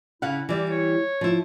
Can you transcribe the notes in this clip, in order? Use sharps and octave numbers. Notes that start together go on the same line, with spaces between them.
C#3 E4 F5 F#5
E3 G3 D5
C#5
F3 E4